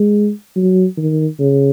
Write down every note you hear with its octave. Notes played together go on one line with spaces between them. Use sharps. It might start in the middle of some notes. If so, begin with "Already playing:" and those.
Already playing: G#3
F#3
D#3
C#3